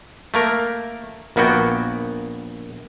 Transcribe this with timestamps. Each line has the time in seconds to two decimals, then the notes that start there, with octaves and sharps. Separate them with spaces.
0.34 A3 A#3 A#4
1.36 A#1 A#3 B3 F#4 G5